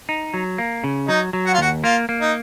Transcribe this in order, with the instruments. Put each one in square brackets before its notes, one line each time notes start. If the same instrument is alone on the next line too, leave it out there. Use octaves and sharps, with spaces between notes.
[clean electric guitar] D#4
F#3
A#3
C#3
[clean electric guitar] F#3 [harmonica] D#4
[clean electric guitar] F#3
[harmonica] F#4
F4
[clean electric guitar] D#2 [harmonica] F#4
[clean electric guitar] A#3 [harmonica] F4
[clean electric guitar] A#3
[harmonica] D#4